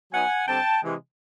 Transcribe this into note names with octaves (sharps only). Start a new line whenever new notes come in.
F#3 B3 D#4 F#5 G#5
D3 G3 C4 G5 A5
C3 E3 G#3